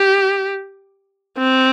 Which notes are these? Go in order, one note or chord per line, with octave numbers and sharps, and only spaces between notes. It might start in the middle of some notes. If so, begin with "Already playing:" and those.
Already playing: G4
C4